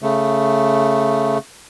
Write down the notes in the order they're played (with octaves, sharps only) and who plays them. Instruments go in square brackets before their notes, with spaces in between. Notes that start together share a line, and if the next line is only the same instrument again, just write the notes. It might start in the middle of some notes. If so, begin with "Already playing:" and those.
[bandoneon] C#3 A3